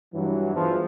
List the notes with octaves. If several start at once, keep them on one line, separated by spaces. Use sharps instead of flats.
G2 E3 F#3
E2 E3 F3